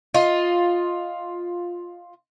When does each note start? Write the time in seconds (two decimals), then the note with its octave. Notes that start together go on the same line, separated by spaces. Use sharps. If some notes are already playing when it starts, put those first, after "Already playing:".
0.14 F4 D#5